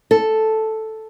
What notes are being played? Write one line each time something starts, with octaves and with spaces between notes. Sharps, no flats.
A4